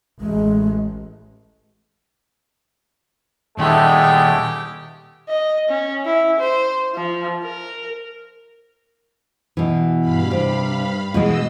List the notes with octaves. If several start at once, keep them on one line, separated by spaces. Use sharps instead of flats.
A1 G#3
E2 A#2 D#3 G#3 A3 G4 G5
D#5
C#4
E4
C5
F3
A#4
B2 E3
G2 F5 B5
C3
B2 E3 G#3 D#5 E6